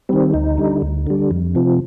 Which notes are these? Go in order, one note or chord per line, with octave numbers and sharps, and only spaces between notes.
D#3 G3 C4
D2 D#4
D3 G3
D2
D3 G3
F2
C3 F3